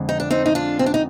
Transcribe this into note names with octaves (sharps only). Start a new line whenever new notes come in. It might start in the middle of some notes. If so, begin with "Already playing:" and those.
Already playing: F2 D3 G#3
D#4
D4
C4 D#4
D#4
D4 F4
C4
D4
D#4